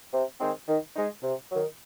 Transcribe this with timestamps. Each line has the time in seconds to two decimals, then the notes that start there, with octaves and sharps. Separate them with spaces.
0.12 C3
0.39 D#3 G#3 C4 D#4
0.67 D#3
0.94 G#3 D#4
1.22 C3
1.50 D#3 F#3